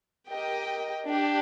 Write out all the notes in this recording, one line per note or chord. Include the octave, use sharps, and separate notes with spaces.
G4 A#4 D#5 G5
D4 G4